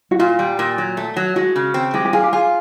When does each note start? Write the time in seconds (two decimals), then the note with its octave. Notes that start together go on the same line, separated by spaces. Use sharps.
0.11 F#4
0.19 A#2 F4
0.39 G3
0.59 A#2
0.78 F#3
0.97 A3
1.16 F#3
1.36 G#3 F#4
1.56 C#3
1.74 C4
1.94 G#3 G4
2.05 G4
2.13 F4 G#4
2.23 G4
2.33 F4 G#4